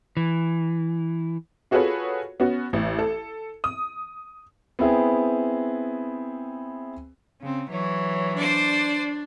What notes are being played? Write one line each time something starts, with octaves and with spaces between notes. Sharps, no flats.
E3
F4 F#4 G#4 A4 B4 C#5
B3 C#4 F#4
A1
A4
D#6
B3 C4 E4 G#4
C#3 C4
E3 F#3 C#5
D4 C5 D5